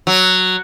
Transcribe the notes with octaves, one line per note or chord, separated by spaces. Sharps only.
F#3